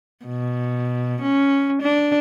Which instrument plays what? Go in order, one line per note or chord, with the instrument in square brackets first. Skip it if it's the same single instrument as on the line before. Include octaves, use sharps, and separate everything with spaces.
[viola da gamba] B2
C#4
D4